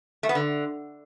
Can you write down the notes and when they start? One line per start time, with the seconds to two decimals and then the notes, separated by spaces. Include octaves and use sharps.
0.23 A3
0.29 B3
0.35 D3